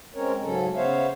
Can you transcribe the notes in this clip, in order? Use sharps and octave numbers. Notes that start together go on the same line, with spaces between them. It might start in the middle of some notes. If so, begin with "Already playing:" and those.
G#3 C4 C#4 A#4 C#5
G#2 C#3 F#3 C#4 A4
C#3 B3 C5 C#5 E5 F5